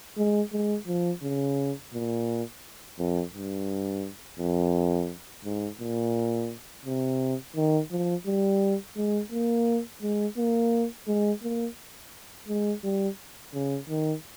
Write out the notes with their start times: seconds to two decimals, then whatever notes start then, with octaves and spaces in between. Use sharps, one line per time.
0.17 G#3
0.52 G#3
0.87 F3
1.23 C#3
1.94 A#2
2.98 F2
3.34 G2
4.39 F2
5.45 G#2
5.80 A#2
6.86 C3
7.56 D#3
7.91 F3
8.26 G3
8.97 G#3
9.32 A#3
10.02 G#3
10.37 A#3
11.08 G#3
11.43 A#3
12.48 G#3
12.84 G3
13.54 C#3
13.89 D#3